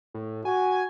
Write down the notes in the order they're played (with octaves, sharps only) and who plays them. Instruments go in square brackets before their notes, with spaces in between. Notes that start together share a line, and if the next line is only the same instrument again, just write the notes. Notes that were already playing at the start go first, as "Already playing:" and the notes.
[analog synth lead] A2
[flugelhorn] F#4 [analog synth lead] G#5